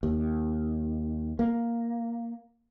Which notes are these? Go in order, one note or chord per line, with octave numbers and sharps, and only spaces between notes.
D#2
A#3